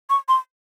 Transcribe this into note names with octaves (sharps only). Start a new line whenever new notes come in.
C#6
C6